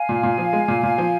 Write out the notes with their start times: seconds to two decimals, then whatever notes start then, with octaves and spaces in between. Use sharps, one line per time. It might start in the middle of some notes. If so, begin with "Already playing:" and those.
Already playing: F5 G#5
0.09 A#2
0.23 A#2
0.38 F3
0.53 G#3
0.68 A#2
0.83 A#2
0.98 F3